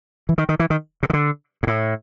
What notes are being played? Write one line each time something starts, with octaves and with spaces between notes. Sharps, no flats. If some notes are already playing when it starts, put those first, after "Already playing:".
E3
D#3
D#3
E3
D#3
C3
D#3
D3
G#2
A2